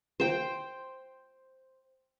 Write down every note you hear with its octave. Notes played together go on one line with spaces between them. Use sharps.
C5 G5